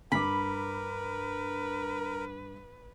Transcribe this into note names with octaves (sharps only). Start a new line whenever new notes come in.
G2 A#4 B4 B5 D6